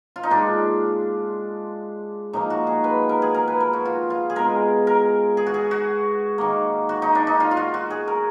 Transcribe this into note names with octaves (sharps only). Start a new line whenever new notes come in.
F4
D#4
A#2 G#3 D4
A#2 F3 A#3 D#4
F#4
G#4
B4
A#4
G#4
A#4
B4
A#4
F#4
F4
F4
G#4
B2 G#3 A#4
A#4
G#4
F#4
G#4
F#4
D#3 A#3
F#4
D#4
D4
D#4
F4
F4
F#4
F#4
G#4
A#4